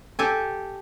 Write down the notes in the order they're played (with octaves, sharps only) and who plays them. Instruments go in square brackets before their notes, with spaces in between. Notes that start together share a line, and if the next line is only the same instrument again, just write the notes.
[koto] G4 A4 G#5